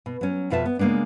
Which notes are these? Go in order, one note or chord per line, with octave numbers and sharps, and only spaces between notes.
B2
F#3 C#4
F2 B2 F4 B4 E5 A5
B3
C#3 G#3 A#3 B3 D4